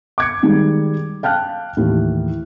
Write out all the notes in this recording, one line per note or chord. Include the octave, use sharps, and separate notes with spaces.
D6 G#6 C#7
D#3 G3 G#3
F5 G5 A5 F6 F#6
D#2 A2 E3